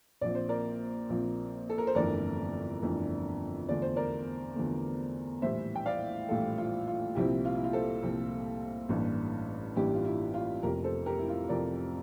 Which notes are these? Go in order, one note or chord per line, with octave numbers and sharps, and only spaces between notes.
A#1 A#2 F3 C4 D5
C5
A#4 D5
A#1 A#2 F3 C4
A4
A#4
C5
G1 F2 E3 A3 D4 A#4 D5
G1 F2 E3 A3 D4
E2 D3 F3 A3 D5
C5
A#4 D5
E2 D3 F3 A3
A#1 A2 E3 G3 C5 E5
G5
D5 F5
A#1 A2 E3 G3 F4 A4
F4
F4
C2 A#2 F3 C4 E4 G4
F4
E4
F4
A4 C5
C2 A#2 F3 C4
A1 G2 E3 A#3 D4
A1 G2 E3 A#3 D4 E4 G4
F4
E4
F4
F1 F2 C3 G4 A#4
A4 C5
G4 A#4
E4
F4
F1 F2 C3 A#4 D5